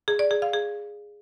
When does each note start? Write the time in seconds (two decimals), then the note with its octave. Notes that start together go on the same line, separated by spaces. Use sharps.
0.08 G#4
0.19 D5
0.31 G#4
0.42 F5
0.54 G#4